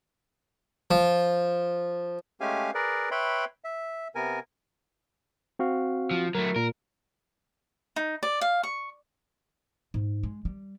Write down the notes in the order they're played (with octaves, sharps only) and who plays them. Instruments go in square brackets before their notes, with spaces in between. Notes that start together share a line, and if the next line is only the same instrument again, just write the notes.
[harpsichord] F3
[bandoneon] G#3 A3 C#4 G4 F5 G#5
G#4 A#4 B4 D5
B4 C#5 E5 G5 B5 C6
E5
C3 B3 A#4 G#5
[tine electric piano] C4 F#4 F5
[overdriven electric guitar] F3
[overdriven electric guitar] F#3 A3 [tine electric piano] A#4
[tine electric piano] A#2 [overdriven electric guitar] A#4
[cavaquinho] D#4
D5
F5
C#6
[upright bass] G#2
G#3
G3